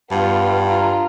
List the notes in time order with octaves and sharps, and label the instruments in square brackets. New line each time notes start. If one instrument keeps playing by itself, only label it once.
[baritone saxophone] G2 [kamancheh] B3 F4
[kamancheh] F4 A#5